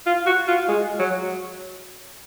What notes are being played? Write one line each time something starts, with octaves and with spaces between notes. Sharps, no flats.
F4
F#4
F4
G#3
F#3